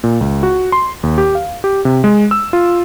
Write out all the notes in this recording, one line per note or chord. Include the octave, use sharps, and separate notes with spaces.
A#2
C#2
F#4
C6
D#2
G4
F5
G4
C3
G#3
E6
F4